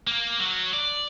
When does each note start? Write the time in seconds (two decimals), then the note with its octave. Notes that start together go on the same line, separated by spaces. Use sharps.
0.07 A#3
0.40 F#3
0.73 D5